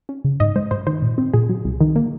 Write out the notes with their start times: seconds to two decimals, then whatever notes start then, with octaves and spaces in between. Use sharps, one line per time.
0.09 C#4
0.24 C#3
0.40 G#2 D#5
0.56 G#3 C5
0.71 G#2 C5
0.87 D#3 C5
1.02 A#2
1.18 C4
1.33 A#2 G#4
1.49 F#3
1.65 C2
1.81 D#3
1.96 A#3